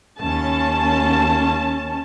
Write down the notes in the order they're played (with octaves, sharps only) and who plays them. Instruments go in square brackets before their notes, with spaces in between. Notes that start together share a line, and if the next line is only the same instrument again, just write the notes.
[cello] D#2 [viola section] C#4 A5